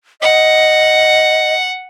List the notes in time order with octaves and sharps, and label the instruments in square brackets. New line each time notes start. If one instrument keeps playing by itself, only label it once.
[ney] D#5 [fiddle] F#5